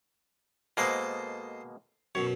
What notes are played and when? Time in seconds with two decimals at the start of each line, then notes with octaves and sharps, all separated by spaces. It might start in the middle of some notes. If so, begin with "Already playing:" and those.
0.77 B2 G#3 A#3 A4 C5 D#5
2.15 F#2 B2 C#5